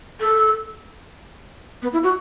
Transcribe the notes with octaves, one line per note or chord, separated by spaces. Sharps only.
A4
B3
E4
F#4